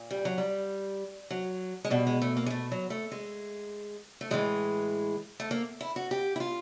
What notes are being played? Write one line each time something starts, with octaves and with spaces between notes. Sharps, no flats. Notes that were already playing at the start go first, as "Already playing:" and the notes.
Already playing: A#2
G3
F#3
G3
F#3
G#3
B2 G3
G#3
A3
A#3
G#3
A3
F#3
A3
G#3
A3
A2 E3 G#3
A3
A#3
E4
F#4
G4
E4
F4